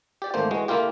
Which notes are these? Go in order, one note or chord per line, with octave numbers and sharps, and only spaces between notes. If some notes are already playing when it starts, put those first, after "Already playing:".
G4 D5
G#1 D3 A3 A#3 C5
E3 G#3 F#4
D3 A#3 E4 F4 G4